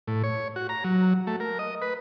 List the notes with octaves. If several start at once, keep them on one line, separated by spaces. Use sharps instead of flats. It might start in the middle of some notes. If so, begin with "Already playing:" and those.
A2
C#5
F#4
A#5
F#3
A3
A#4
D#5
B4